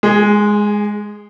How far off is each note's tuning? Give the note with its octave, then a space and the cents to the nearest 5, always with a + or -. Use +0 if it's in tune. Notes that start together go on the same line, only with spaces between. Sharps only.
G#3 +0 G#4 -30